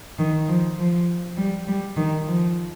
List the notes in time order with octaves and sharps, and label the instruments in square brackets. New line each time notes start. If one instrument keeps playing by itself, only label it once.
[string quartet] D#3
F3
F3
G3
G3
D#3
F3